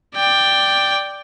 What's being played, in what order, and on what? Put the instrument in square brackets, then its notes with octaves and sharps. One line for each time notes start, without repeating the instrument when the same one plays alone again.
[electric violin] D5 G5